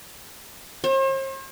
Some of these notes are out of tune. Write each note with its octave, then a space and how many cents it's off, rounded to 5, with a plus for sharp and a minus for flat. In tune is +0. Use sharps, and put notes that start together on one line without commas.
C5 +45